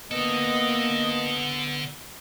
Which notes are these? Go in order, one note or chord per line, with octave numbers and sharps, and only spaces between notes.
D3 A#3 B3 A4 D#5